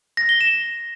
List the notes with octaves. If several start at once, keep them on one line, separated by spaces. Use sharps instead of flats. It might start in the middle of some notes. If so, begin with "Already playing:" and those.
A#6
G7
E7